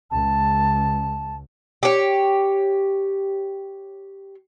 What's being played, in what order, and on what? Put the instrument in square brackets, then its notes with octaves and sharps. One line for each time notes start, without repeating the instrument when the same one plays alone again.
[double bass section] C#2 [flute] A5
[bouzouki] G4 C#5